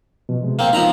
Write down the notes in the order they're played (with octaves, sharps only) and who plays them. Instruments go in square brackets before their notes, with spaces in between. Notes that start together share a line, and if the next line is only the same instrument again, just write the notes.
[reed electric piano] B2 F3
C3 G#3
[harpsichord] A#3 C4
[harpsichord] F3 A#5 B5 [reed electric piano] B3 D#4